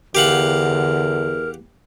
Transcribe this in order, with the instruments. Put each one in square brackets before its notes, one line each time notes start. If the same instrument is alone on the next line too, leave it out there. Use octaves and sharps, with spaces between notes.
[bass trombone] E2 [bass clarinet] D3 [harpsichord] G4 F5 F#5 [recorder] A#4